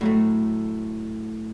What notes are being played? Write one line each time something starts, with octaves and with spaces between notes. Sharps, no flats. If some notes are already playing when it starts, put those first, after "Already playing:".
A2 F#3 A3